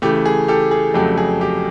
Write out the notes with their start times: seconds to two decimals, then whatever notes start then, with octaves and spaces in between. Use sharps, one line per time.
0.02 C#3 E3 A3 G4
0.25 G#4
0.48 G4 A4
0.71 G#4
0.94 F2 C#3 F#3 A3 G4
1.18 G#4
1.41 G4